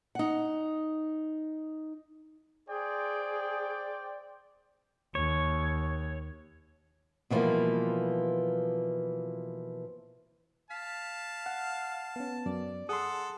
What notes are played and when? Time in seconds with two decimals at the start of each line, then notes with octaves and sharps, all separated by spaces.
0.15 D#4 F#5
2.69 G#4 C5 D5 G5
5.15 D#2 C#5
7.30 B2 D3 E3 F3 G3 A#3
10.71 F5 A5 B6
11.46 F#5
12.16 B3 C#4
12.46 F#2 D5
12.89 G#4 A4 F#5 C6 D#6